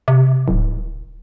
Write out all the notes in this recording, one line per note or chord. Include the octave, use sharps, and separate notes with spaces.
C3
D1